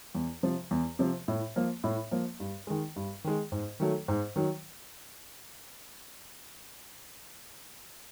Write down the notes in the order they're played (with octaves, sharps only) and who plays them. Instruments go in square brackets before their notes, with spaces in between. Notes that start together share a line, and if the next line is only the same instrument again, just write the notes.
[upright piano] E2
C3 F3
E2
C3 F3
A2
F3 A#3
A2
F3 A#3
G2
D#3 G#3
G2
D#3 G#3
G#2
D#3 F#3 A3
G#2
D#3 F#3